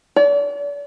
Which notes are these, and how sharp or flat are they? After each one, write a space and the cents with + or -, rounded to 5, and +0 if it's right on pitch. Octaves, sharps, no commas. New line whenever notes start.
D5 -40